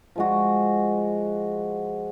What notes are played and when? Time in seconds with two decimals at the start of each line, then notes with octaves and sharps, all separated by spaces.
0.16 F3 G#3 F#4